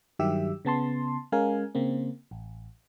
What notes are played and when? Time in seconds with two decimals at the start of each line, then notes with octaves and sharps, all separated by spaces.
0.19 G2 D#3 F#3 G4 E5 E6
0.65 C#3 B3 A5 C6
1.32 G#3 C#4 A#4 F5 G#5
1.75 C#3 A#3 C4
2.31 A1